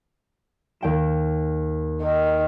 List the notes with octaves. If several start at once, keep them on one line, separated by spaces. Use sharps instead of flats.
D#2 G5 E7
D#3